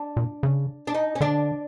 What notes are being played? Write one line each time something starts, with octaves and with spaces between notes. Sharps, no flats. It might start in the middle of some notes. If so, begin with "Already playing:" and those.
Already playing: D4
A#2
C#3
D4
D#4
C#4
D3 D4